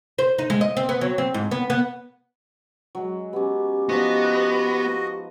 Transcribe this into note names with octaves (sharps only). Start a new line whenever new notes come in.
C5
D#4
G#3
D#5
C4
B3
F#3
C4
G#2
B3
B3
F#3 G#3
B3 C#4 G4
F3 B3 D#4 F#4 D#5